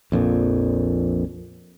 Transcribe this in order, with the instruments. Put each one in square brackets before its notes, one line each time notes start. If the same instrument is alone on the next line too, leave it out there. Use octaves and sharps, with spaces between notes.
[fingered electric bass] A#1 F2 A#2